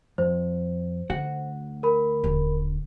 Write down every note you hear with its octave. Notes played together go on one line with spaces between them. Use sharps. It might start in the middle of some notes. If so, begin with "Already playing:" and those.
F2 C5
D2 D3 F#4 F#5
A#4 B5
D#1 D3